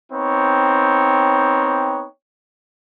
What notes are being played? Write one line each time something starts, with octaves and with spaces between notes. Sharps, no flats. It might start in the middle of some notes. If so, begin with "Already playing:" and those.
B3 C4 D#4 C#5 G5